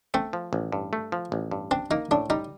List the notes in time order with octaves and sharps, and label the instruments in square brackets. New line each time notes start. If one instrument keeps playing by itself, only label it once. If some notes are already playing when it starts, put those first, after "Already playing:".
[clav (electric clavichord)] A3 [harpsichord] C4
[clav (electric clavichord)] F3
A1
G2
A3
F3
A1
G2
[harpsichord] C4 [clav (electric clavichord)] D4
[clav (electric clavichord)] A#3 [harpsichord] D#4
[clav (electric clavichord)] A2 [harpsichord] D4
[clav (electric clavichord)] G3 [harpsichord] D#4